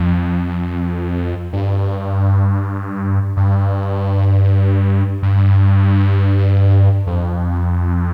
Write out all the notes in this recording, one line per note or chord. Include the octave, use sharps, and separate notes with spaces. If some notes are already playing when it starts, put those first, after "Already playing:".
Already playing: F2
G2
G2
G2
F2